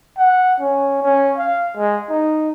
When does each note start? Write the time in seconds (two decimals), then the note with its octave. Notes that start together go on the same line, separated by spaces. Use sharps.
0.17 F#5
0.60 C#4
1.03 C#4
1.37 F5
1.77 G#3
2.10 D#4